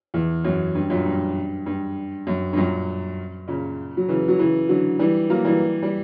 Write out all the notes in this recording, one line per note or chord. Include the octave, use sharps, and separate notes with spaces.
E2
F#2
G2
F#2 A#2
G2
G2
F#2
G2
F#2 A#2
A#2 C#3
F#3
C#3 E3
F#3
C#3 E3
D3 F#3
E3 G3
F#3 A#3
E3 G3
G3